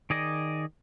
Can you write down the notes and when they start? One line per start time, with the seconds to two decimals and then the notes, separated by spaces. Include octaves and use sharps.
0.10 D#3 G#4 D5 D#5